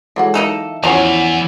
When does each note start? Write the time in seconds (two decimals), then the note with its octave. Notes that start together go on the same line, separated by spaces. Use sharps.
0.16 E3 F#3 G#3 G#4 A4 F#5
0.34 A#3 D#4 A4 E5
0.84 E2 F3 F#3 C#4 E4 F#5 G#5 A#5